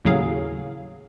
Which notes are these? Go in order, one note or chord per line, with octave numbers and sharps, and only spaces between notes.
D#2 A2 C#3 F#3 G#4 F5